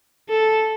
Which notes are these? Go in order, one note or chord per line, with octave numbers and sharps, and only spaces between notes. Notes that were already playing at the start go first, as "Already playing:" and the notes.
A4